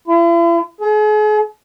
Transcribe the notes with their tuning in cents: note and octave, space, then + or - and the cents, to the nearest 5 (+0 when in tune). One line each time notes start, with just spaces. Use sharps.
E4 +45
G#4 +40